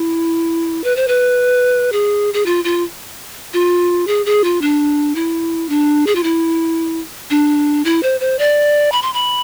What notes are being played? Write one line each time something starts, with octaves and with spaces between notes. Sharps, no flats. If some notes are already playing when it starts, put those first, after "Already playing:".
Already playing: E4
B4
C5
B4
G#4
G#4
F4
F4
F4
G#4
G#4
F4
D4
E4
D4
G#4
F4
E4
D4
E4
C5
C5
D5
B5
C6
B5